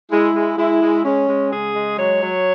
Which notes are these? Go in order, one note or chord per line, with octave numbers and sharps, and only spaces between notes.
G#3 E4
G#3
G#3 E4
G#3
G#3 C#4
G#3
C#3 G#4
G#3
F#3 C#5
F#3